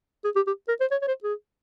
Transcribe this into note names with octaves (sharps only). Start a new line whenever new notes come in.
G#4
G4
G4
A#4
C5
C#5
C#5
C5
G#4